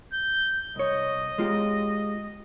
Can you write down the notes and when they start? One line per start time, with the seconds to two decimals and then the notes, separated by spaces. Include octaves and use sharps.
0.13 G6
0.76 C2 C#5 D#5
1.38 G#3 F4 G4